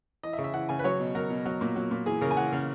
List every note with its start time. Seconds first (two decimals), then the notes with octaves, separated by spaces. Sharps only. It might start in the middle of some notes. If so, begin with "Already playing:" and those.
0.23 E3 D#5
0.33 E5
0.38 C#3
0.44 E5
0.54 E3 F#5
0.69 C#3 G#5
0.79 B4
0.84 F#3 C#5
1.00 B2
1.15 F#3 A#4
1.30 B2
1.45 F#3
1.61 A#2
1.76 F#3
1.91 A#2
2.06 E3 G#4
2.21 C#3 A#4
2.31 G#5
2.37 E3 F#5
2.52 C#3